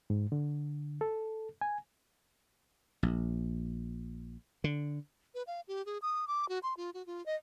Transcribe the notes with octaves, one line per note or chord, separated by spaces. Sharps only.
G#2
D3
A4
G#5
A#1
D3
B4
F5
G4
G#4
D#6
D6
F#4
C6
F4
F#4
F4
D#5